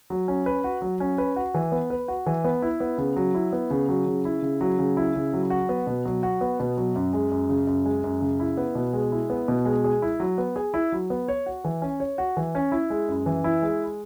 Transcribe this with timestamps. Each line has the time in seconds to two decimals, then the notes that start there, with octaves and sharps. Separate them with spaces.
0.10 F#3
0.28 C#4
0.46 B4
0.64 F#4
0.82 F#3
1.00 C#4
1.18 B4
1.36 F#4
1.54 E3
1.72 B3
1.90 B4
2.08 F#4
2.26 E3
2.44 B3
2.62 E4
2.80 B3
2.98 C#3
3.16 F#3
3.34 E4
3.53 B3
3.70 C#3
3.89 F#3
4.06 C#3
4.25 E4
4.42 C#3
4.61 F#3
4.79 C#3
4.97 E4
5.15 C#3
5.33 F#3
5.50 F#4
5.69 B3
5.87 B2
6.05 F#3
6.23 F#4
6.41 B3
6.60 B2
6.77 F#3
6.95 F#2
7.13 G#3
7.31 F#2
7.49 C#3
7.67 F#2
7.85 G#3
8.04 F#2
8.21 C#3
8.40 E4
8.57 B3
8.75 B2
8.93 G#3
9.12 E4
9.30 B3
9.48 B2
9.65 G#3
9.84 G#4
10.02 E4
10.20 F#3
10.38 B3
10.56 G#4
10.74 E4
10.92 F#3
11.10 B3
11.28 C#5
11.46 F#4
11.64 E3
11.82 C#4
12.00 C#5
12.18 F#4
12.37 E3
12.55 C#4
12.72 E4
12.90 G#3
13.08 F#2
13.26 E3
13.44 E4
13.62 G#3